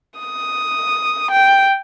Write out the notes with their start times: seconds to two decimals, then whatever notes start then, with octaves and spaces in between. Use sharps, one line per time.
0.19 D#6
1.31 G5